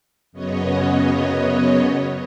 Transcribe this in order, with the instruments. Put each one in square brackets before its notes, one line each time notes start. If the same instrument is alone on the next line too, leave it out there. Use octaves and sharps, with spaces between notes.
[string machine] F#2 C#3 B3 C#5 D#5